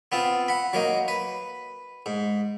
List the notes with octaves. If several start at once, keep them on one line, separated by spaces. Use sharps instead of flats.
B3 C4 F4
F#5 B5
F#3 A#3 D#4
B4
G#2